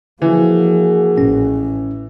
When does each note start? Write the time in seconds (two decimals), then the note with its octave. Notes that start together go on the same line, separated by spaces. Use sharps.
0.22 E3 F3 A#3 F#4 G#4
1.18 A1 C#4